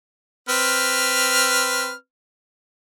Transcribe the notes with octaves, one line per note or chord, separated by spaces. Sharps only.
C4 B4 F6